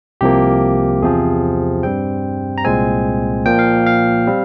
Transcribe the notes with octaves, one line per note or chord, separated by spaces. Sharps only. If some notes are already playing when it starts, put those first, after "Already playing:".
C2 C3 F3 A#3 G4
E2 C3 F3 C4 G#4
G2 G3 C4 G5
A#5
C2 A#2 G#3 C4 G#5
A#2 F3 A#3 G5
F5
F5
G3 C4